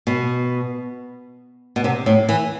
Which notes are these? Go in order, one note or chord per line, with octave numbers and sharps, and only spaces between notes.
B2
B2
C3
A2
E3